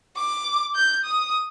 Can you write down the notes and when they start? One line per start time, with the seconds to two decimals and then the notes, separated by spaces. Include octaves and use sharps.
0.17 D6
0.75 G6
1.05 D#6